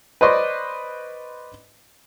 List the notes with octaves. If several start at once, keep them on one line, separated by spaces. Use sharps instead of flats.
B4 C5 D5 D#5 C6 C#6